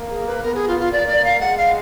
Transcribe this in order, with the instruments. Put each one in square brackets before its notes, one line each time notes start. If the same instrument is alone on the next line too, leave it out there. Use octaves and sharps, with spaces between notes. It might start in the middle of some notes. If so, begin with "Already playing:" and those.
Already playing: [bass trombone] A#3
[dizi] G#4
B4
[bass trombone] B3 [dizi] A#4
[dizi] G#4
F4
F4
[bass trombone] A#3 [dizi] D5
[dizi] D5
F5
[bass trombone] G#3 [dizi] F#5
[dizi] F5